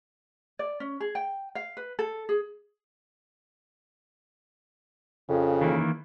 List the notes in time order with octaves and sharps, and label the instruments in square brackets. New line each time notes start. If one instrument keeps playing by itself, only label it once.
[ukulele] D5
C#4
G#4
G5
F5
B4
A4
G#4
[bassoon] F2 [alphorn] C#3
[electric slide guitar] D#3 E3 A#3